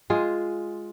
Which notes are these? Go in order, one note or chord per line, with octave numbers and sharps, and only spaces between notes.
G#3 F4 G#4